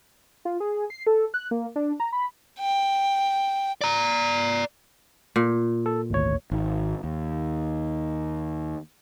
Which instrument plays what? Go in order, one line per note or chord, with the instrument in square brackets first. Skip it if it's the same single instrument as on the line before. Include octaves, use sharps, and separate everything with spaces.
[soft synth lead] F4
G#4
C7
A4
F#6
A#3
D4
A#5
B5
[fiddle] G5
[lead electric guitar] D5 A#5
[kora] A#2
[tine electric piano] A4
G#1 D2 C#5
[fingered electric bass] G#1
D#2